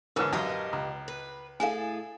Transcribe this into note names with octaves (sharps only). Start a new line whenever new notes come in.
G#2 D3 E3 G3 C#4 A#4 B4
A#1 F#2 F#3 G4 D#5 F5 A5
C#2 A#5
B4
A2 G#4 A4 F5 G#5